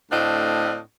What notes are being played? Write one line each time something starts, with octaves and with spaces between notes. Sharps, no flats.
D2 A2 C4 D4 D#5 F5